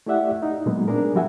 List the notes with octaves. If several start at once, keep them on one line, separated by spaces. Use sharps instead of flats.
A3 E4 G4 D5 E5 F#5
D#4
A#2 F#3 G#3 A3 B3
C4 D4 G#4 A#4
F3 G3 F#4 E5 F#5 G#5